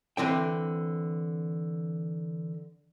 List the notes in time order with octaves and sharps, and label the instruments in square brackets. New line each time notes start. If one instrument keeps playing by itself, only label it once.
[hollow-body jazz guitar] D3 E3 C4 G5